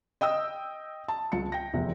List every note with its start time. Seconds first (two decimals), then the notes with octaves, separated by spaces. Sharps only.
0.21 D#5 G5 D#6 E6
1.08 A5
1.32 C#2 A5 C#7
1.52 G5 A#6
1.73 F1 E2 C3